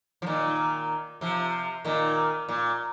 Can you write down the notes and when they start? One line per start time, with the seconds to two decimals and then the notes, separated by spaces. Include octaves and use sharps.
0.22 F3
0.27 A#2 D#3
1.21 C3 F3
1.85 A#2 D#3
2.49 A#2